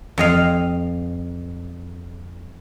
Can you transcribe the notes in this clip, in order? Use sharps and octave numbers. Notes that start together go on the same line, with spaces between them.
F2 D#5 F5